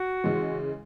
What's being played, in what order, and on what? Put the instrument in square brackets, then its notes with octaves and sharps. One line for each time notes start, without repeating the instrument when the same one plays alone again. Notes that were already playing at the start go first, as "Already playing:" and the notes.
Already playing: [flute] F#4
[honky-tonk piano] C#3 E3 G#3